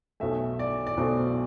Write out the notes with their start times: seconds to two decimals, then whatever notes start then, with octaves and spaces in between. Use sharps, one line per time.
0.20 B1 B2 A3 E5
0.59 D5
0.87 D5
0.97 B1 B2 A3 C5